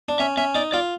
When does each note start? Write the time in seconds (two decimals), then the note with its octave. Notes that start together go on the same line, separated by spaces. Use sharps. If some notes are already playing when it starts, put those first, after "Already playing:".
0.09 D4
0.19 C#4 E5
0.37 C#4 E5
0.55 D#4 D5
0.72 F4 D5